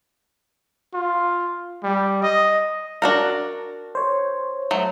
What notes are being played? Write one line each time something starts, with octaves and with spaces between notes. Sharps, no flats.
F4
G3
D#5
D4 F#4 A#4
C5 C#5
F#3 A3